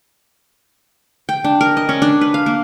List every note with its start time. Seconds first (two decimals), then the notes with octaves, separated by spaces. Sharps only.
1.29 G5
1.44 D4
1.61 A#4
1.77 D#5
1.89 C#4
2.02 D4
2.21 B4
2.34 F5
2.46 A#3